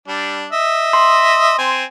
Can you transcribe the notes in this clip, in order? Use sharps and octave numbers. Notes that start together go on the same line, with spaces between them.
G3 D4
D#5 E5
C6
C4 G#5